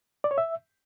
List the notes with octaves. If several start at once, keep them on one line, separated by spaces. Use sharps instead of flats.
D5
C#5
E5